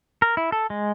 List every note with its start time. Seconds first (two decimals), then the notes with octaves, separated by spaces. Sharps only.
0.22 A#4
0.37 E4
0.52 A4
0.70 G#3